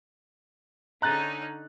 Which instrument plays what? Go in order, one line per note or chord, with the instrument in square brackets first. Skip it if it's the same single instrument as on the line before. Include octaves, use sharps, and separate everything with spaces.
[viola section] D3 C#4 D#4 [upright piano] A#5 F#6 A6